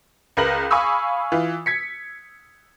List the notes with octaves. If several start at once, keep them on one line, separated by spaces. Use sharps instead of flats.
C#2 A#4 B4 A#6 F#7
F5 G#5 B5 C#6 D#6 E6
E3 F4
G#6 B6 C#7